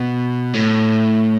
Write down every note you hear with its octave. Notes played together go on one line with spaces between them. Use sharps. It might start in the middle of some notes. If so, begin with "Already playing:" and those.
Already playing: B2
A2